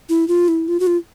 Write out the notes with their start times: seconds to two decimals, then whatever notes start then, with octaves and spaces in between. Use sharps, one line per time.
0.09 E4
0.28 F4
0.48 E4
0.68 F4
0.80 F#4
0.87 F4